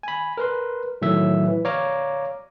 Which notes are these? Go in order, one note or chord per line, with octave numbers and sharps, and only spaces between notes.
G#5 B5
A#4 B4 C6
A2 D#3 F#3 A3 E5
E3
C#5 D5 F5 A#5 D6